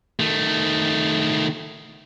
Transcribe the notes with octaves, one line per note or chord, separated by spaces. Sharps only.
D#3 A3